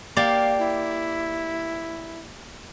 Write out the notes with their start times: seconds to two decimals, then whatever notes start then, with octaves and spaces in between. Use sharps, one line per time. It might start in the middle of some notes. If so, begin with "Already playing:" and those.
0.17 A#3 G4 D5 F5
0.59 E4